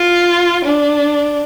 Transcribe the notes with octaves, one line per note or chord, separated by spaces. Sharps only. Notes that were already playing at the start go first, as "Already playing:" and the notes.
Already playing: F4
D4